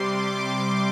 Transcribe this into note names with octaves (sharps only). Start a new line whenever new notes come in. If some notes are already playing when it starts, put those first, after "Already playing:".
Already playing: C3 G3 C6 D6